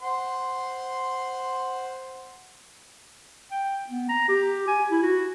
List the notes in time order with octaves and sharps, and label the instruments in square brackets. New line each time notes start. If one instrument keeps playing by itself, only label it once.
[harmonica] C5 F#5 C6
[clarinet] G5
B3
A#5
G4
G#5
E4
F#4